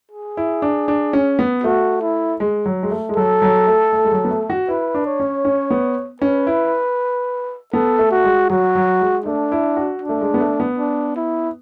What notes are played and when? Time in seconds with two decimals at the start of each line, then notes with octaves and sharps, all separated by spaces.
0.11 G#4
0.37 E4
0.62 D4
0.88 D4
1.13 C#4
1.39 B3
1.64 A3 F#4
2.02 E4
2.40 G#3
2.66 F#3
2.83 G#3
2.91 A3
3.09 G#3
3.16 F#3 A4
3.42 F#3
3.67 A3
3.92 A3
4.05 G#3
4.12 F#3
4.24 B3
4.31 A3
4.50 F#4
4.68 E4 B4
4.94 D4
5.06 C#5
5.20 C#4
5.45 C#4
5.70 B3
6.21 C#4 B4
6.47 E4
7.73 B3 A4
7.99 A3
8.11 F#4
8.24 G#3
8.50 F#3 F#4
8.75 F#3
9.01 G#3
9.26 A3 D4
9.52 E4
9.77 F#4
10.02 D4
10.09 A3
10.21 G#3
10.34 B3
10.40 A3
10.60 B3
10.78 D4
11.16 E4